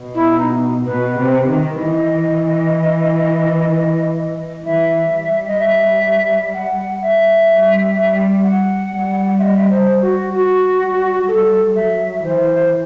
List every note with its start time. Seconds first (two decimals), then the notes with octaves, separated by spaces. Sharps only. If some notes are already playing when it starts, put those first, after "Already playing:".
Already playing: B2
0.15 E4
0.38 D#4
0.85 B2 B4
1.18 C3
1.49 D#3
1.80 E3 D#5
4.64 E3 E5
5.12 G3
5.48 D#5
5.59 E5
6.54 F#5
7.02 E5
7.49 G3
7.97 G3
8.44 F#5
8.92 G3
9.39 E5
9.42 D#5
9.56 E5
9.63 D#5
9.70 C5
10.02 F#4
10.34 F#4
10.80 G3
11.28 G3 A4
11.75 F#3 E5
12.24 E3 C5